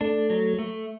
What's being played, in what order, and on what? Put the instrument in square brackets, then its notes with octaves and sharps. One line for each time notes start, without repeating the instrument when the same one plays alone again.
[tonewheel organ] A3 [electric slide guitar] D4
[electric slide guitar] F#3
A3